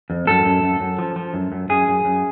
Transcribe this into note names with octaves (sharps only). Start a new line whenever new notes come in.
F2
F#2 A4
F#2
F#2
F#2
F3
F3
F#2
F#2
F#2 G#4
F#2
F#2